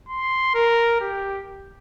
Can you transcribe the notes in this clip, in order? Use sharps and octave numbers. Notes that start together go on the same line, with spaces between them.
C6
A#4
G4